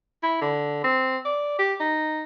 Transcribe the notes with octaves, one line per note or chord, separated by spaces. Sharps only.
E4
D3
C4
D5
G4
D#4